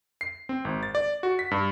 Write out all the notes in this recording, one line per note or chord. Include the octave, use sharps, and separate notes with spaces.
C7
C4
G#1
A6
D5
F#4
B6
G2